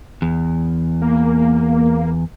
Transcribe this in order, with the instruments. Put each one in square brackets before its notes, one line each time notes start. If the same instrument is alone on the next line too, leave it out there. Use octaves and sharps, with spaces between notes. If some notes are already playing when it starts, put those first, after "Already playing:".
[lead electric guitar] E2
[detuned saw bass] A#3